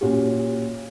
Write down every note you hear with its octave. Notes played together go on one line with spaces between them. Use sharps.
A#2 C#4 F#4 G4